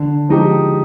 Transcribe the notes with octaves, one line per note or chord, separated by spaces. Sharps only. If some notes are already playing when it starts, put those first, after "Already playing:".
Already playing: D3
F3 G#3 D#4 G4